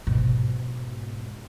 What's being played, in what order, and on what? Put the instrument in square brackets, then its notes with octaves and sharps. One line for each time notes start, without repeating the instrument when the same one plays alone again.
[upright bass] G#2 B2